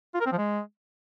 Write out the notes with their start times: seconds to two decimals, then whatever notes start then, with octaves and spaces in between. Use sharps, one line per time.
0.14 F4
0.20 A#4
0.26 C4
0.32 F3
0.38 G#3